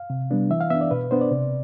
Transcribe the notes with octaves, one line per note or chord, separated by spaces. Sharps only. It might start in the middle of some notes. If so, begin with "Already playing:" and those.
Already playing: F5
C3
G3 B3 D4
E3 E5
F5
B3 D4 E5
D5
B2 B4
B3 D4 C5
D5
C3